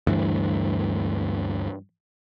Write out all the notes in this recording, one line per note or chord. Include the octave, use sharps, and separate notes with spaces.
D2 G2 E3